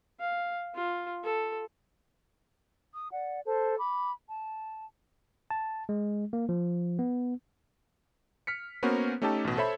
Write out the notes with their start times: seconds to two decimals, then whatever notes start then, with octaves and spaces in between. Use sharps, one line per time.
0.20 F5
0.75 F4
1.24 A4
2.94 D#6
3.11 D5 F#5
3.46 A4 C5 A5
3.78 B5 D6
4.28 A5
5.51 A5
5.89 G#3
6.33 A#3
6.49 F3
6.99 B3
8.47 F6 B6 C#7
8.83 A#3 B3 C#4 F#4 A#4 C5
9.22 A3 C#4 D#4 G4 A4 A5
9.45 A1 B2
9.57 A4 C5 C#5 E5 B5